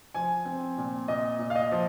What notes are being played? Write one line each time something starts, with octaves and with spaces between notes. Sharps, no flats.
F3 G#5
C4
A#2
A#2 D#5
A#2
F5
D#5
F3